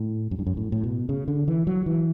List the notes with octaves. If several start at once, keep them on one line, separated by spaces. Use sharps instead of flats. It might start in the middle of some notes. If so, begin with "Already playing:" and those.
Already playing: A2
F#2
G2
F#2
A2
A2
B2
C#3
D3
E3
F#3
E3